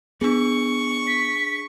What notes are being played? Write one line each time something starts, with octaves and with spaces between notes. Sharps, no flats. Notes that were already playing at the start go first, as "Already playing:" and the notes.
B3 D4 G#4 C#6
B6